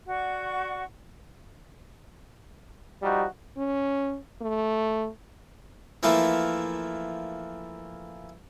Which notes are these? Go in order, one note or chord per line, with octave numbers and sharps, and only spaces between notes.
F#4 D5 F#5 C#6
F3 G3 D#4 F#4
C#4
A3
E3 F3 A3 A#3 E4